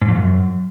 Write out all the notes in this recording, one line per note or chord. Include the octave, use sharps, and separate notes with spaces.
G#2
F2
F#2